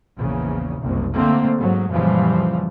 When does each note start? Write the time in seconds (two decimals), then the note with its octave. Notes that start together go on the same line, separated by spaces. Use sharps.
0.16 A#1 E2 C#3
0.81 F#1 C2
1.14 D3 A3 A#3 C4
1.57 G#2 F#3
1.90 F#2 A#2 C#3 E3 F3 G3